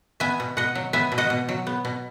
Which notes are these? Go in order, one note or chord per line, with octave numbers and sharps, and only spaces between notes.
B3 E5 G#5
B2
B2 D#5 F#5
F#3
B3 E5 G#5
B2
D#5 F#5
B2
F#3
B3
B2